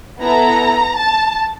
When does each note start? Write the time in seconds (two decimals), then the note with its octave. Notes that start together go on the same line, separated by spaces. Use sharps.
0.20 B3 E4 A4 A#5
0.97 A5